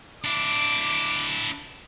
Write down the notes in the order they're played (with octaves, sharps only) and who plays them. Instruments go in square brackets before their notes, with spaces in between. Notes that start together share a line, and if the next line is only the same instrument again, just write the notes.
[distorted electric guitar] D4 E4 [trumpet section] D6